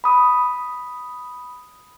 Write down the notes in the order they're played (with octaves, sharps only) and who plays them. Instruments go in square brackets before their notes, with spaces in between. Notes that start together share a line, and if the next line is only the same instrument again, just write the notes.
[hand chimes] B5 D#6